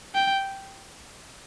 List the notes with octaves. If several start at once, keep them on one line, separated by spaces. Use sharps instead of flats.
G5